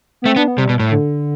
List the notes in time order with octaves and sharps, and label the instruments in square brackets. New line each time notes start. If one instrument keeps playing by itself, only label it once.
[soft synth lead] B3
[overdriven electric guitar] A3 [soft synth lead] C4
[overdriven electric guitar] B3 [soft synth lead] D4
[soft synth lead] B3
[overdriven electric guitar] C3 [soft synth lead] G3
[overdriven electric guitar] B2
A2
[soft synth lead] D3